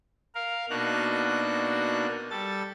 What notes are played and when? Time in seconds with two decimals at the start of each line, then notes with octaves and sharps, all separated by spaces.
0.35 A#4 F5
0.70 B2 A#3 D4 D#4 F#4 F#6
2.30 G3 A4 A6